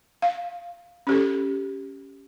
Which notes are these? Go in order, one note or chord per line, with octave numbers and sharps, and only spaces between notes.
F5
C#4 G4 A4